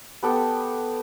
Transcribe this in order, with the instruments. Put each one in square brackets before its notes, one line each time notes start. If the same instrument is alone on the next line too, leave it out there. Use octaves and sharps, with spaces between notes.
[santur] B3 G4 A4 G5